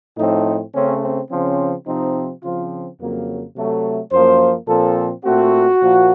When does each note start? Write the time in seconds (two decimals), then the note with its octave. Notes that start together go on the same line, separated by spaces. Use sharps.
0.18 A2 F3 A3 C4 D#4
0.74 C#3 A3 C4 C#4
1.02 C4
1.30 C#3 F3 C4 C#4
1.86 C3 F3 C4 D#4
2.43 C#3 F3 C4 F4
3.00 F2 C#3 F#3 A#3
3.55 C3 F#3 A3
4.11 F#2 F3 A#3 C5
4.68 A#2 F3 C4 A4
5.24 A#2 A3 C4 F#4
5.81 A#2 F3 A#3